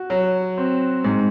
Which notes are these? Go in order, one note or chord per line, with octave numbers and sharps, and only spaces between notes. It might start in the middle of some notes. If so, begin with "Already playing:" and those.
Already playing: F#4
F#3
C4
G#2